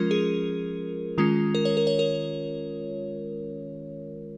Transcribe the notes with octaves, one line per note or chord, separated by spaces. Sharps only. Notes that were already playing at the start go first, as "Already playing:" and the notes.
Already playing: F3 G#3 C#4 F4 A#4
G#4
D#3 G#3 C#4 F4
A#4
C#5
A#4
C#5
A#4